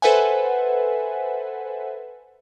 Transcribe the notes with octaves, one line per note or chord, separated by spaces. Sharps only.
A4 B4 C5 E5 F#5 G#5